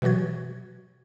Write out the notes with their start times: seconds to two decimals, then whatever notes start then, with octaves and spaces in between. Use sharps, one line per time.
0.02 B2 E3 F#3 F#4 G#6